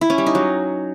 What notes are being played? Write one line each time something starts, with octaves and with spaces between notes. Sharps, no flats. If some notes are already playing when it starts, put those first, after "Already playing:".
E4
C#4
G3
D#4
F#3